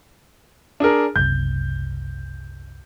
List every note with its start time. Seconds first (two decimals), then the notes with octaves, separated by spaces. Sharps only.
0.80 D4 G#4 A#4
1.16 F#1 C2 G6